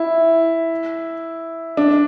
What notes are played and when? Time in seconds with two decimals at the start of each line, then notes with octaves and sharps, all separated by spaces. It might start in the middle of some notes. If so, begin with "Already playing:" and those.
Already playing: E4
1.77 D4